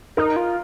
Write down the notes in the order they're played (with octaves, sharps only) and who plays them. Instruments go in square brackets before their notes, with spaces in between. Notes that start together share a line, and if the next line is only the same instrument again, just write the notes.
[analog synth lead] D#4 [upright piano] A#4
[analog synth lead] F4